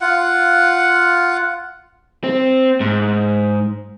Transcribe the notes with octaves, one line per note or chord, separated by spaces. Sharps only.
F4 F#5
C4
G#2